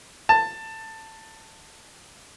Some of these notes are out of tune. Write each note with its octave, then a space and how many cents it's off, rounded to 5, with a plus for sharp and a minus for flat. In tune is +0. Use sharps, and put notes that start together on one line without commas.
A5 +15